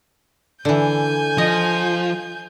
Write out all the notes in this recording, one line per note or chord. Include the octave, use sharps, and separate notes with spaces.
D3 E3 G#5 G6
F3 D#5